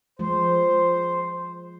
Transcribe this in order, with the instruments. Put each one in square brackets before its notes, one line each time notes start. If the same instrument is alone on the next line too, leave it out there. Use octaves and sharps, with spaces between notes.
[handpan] F3 G#3 [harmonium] C5